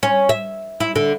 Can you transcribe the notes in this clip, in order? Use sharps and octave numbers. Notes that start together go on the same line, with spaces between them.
C#4
E5
E4
D3